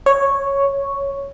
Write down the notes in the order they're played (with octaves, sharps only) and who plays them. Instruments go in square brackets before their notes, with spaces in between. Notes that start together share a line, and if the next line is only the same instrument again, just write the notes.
[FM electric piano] C#5